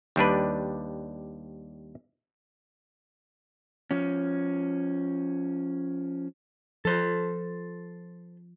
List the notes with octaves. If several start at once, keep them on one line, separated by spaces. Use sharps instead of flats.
D#2 G3 D4 B4
F3 C#4
F3 A4 C5